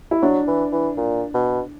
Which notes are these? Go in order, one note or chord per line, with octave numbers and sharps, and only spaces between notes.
E4
F#3 D4
E3
E3
A#2
B2